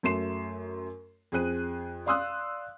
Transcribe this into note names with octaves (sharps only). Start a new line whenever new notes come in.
F#2 F#3 A3 C6 C7 E7
F2 G#4 C5 F#6 D#7
D5 F5 C6 D#6 E6 F#6